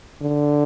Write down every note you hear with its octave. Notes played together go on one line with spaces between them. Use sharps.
D3